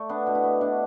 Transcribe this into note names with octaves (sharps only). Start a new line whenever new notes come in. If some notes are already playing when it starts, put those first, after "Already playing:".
Already playing: A3 D5
B3 D4
B2
E4
B3
B2 D4